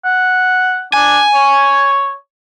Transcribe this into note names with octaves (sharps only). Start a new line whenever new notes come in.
F#5
D4 G#5
C#5